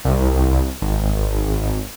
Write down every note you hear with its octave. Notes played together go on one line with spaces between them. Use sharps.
C2
G#1